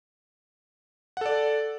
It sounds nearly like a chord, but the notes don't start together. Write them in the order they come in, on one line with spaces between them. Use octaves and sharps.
F#5 A4 D5